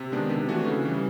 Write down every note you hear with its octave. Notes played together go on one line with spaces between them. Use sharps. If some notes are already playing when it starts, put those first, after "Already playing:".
Already playing: C3
D#3 G#3 B3 D4
C3
E3 A3 D4 F#4
C#3
E3 G3